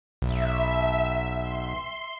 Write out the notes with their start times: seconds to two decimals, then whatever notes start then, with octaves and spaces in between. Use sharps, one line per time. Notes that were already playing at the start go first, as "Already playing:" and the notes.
0.22 B1 E5
1.39 C6